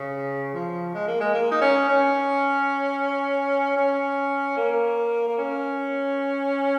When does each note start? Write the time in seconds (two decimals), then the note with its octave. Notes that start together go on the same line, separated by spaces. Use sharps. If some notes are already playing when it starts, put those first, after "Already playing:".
Already playing: C#3
0.54 F3
0.94 G#3
1.07 A#3
1.20 G#3
1.34 A#3
1.51 D#4
1.61 C#4
1.89 C#4
3.77 C#4
4.57 A#3
5.27 A#3
5.38 C#4